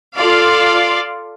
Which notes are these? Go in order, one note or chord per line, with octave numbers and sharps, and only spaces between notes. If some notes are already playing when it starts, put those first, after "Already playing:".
F4 A4 D5 F5